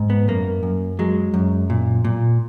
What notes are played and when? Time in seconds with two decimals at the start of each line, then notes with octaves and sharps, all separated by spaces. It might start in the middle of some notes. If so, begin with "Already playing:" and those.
Already playing: G#2
0.10 B3
0.28 F#2 A#3
0.63 F#2
0.99 F#3 G#3
1.34 F#2
1.70 A#2
2.05 A#2